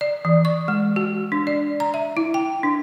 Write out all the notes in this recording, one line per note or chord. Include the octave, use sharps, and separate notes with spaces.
D5
E3
C#6
G#3
F#4
D4
D5
A#5
E5
E4
G5
D4